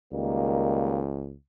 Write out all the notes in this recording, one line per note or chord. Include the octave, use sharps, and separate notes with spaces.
C#2 D#3 G3 A#3